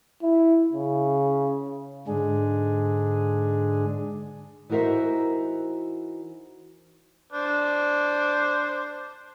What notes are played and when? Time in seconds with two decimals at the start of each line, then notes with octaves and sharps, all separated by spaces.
0.22 E4
0.73 C#3
2.08 G#2 D3 G#3 D4 G#4
4.69 E3 D#4 F#4 A#4 C5 E5
7.32 D4 C5